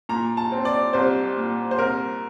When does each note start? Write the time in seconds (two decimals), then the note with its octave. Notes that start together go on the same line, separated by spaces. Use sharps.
0.09 A#2 A#5
0.37 A5
0.52 C4
0.65 D5
0.93 C2 C5
1.36 A#2
1.71 C5
1.78 C2 A#4